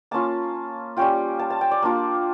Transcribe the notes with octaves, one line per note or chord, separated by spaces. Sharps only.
A#3 C#4 F4 A5
G3 C#4 F4 G5
A5
A5
G5
D5
A#3 D4 F4